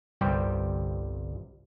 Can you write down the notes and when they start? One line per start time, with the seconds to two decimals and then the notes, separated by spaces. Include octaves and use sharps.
0.21 G1 C2 G3 G4 C5 G5